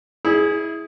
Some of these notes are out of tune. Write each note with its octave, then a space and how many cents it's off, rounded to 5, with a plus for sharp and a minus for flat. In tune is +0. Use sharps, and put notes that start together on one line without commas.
E4 -20 G#4 +0